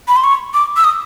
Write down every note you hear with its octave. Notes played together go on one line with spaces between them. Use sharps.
B5
C6
C#6
D6
E6
D#6